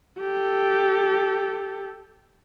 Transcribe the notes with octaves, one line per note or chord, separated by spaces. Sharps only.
G4 A4